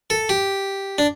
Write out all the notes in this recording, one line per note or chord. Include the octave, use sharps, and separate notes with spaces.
A4
G4
D4